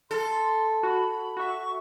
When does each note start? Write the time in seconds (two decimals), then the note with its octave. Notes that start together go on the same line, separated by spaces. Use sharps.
0.11 A4 C6
0.83 F#4 B5
1.37 F#4 E5 C#6